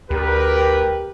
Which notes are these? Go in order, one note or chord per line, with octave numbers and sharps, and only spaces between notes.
D2 G4 A#4 B4